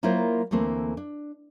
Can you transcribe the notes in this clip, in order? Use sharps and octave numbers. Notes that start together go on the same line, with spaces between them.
F#3 A#3 E4 F4 A#4 C5
D2 E3 A3 A#3 C4
D4